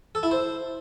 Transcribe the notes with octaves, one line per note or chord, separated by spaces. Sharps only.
A4
E4
C5